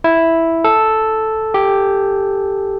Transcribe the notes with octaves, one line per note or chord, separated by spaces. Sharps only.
E4
A4
G4